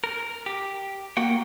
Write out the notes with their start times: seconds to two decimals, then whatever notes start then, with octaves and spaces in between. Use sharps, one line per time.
0.04 A#4
0.46 G4
1.17 A#3 F#4 F#5 G5